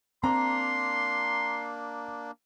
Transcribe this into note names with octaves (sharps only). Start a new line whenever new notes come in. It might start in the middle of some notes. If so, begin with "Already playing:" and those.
A#3 C4 D4 A#5 C6